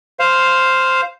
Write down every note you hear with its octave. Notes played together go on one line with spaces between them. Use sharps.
C5 F5